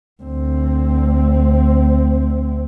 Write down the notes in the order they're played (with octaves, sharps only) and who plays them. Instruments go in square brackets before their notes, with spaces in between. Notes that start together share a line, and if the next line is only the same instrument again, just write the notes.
[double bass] D2 C4